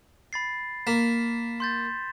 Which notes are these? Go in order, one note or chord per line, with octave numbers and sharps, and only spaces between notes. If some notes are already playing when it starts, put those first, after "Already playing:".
B5 A6 C7
A#3 B6 E7
C6 G6 A6